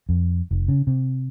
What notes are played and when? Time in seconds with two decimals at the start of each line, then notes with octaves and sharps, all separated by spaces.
0.09 F2
0.51 F1
0.68 C#3
0.87 C3